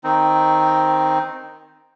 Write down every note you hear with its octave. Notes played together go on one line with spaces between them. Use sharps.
D#3 C4 D#4